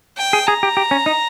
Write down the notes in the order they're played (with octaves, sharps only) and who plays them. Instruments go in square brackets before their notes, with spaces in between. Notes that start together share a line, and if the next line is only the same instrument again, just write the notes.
[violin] G5
[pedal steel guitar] G#4
[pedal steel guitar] G#4 [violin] A#5
[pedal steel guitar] G4
G4
C#4
D#4